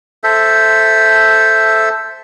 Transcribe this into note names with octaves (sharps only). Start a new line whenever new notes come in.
A4 C5 E5